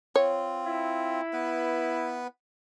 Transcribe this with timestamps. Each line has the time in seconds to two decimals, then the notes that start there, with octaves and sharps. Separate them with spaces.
0.16 C4 F4 C#5
0.67 E4
1.33 B3 B4